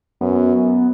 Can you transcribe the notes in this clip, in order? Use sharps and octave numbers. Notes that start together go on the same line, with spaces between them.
F#2 B3